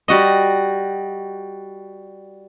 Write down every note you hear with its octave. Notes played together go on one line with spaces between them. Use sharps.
G3 F#4 D#5